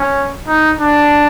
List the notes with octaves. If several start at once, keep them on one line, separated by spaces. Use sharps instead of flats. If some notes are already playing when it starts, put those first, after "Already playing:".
Already playing: C#4
D#4
D4